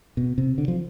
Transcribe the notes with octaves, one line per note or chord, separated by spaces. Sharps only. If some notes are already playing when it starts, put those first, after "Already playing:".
B2
C3
D3
F3